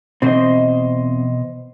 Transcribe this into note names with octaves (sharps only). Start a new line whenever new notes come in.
E2 B2 C4 C5 D#5